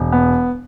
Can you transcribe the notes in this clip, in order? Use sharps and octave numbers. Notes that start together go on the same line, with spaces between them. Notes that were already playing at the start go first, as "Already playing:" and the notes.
Already playing: E1
B3